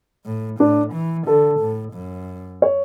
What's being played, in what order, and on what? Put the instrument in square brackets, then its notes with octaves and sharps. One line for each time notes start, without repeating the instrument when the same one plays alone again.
[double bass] A2
[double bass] A2 [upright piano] D4
[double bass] E3
[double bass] D3 [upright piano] A4
[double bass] A2
F#2
[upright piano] C#5